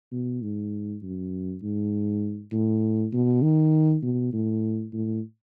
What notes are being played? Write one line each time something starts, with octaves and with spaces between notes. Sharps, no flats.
B2
G#2
F#2
G#2
A2
B2
D#3
B2
A2
A2